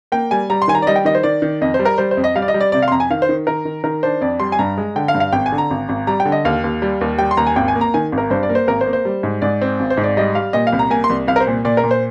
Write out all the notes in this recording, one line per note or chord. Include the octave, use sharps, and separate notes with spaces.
A#3 G5
G3 G#5
G3 A#5
C6
D#3 G#5
A#5
D5
G3 D#5
G5
D#3 D#5
C5
D#3 D5
D#3
F2 D#5
C5
G3
A#4
G3 C5
C5
F2
D#5
G3 F5
D5
D#5
G3
D5
C3 D5
F5
C6
F2 A#5
G#5
D#3 F5
C5
D#3
D#3 A#4
D#3
D#3 A#4
D4 C5
F2 D5
G3 C6
G#5
G2 A#5
G#3
D3 G5
F5
G2
F5
G#1 G5
G#5
D3
A#5
G#1
G#1
G3 A#5
G5
D3
D#5
D#2 F5
D#2
G3
D#2
G3 G5
C6
D#2 A#5
G#5
G#1 G5
G#5
A#3
A#5
D#3 G#5
G#1
A#4
G2 C5
D5
A#3
C5
G#1 A#4
C5
A#3
C5
G3
G#2
G#2 D5
C4
G#1
C5
G#2
D5
G3 D#5
G3 F5
A#2 D#5
F5
C2
A#5
A#3 G#5
C6
C2
C2 F5
A#4
C5
A#2
A#2 D5
A#4
A#2
C5